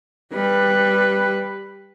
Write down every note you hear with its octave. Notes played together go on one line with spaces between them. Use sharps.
G3 B4